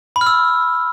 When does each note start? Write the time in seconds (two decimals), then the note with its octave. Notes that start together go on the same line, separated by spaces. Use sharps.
0.16 B5
0.21 F6
0.27 E6